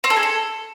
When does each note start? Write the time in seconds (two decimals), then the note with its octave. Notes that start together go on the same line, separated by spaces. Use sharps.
0.04 C4
0.10 A4
0.16 G#4
0.23 A4